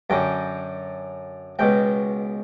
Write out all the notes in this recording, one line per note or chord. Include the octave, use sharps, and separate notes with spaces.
F#2 D3 G5
C#2 B2 G5